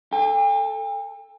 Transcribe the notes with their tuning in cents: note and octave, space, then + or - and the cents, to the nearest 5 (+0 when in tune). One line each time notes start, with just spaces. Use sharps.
A4 +0 G5 +45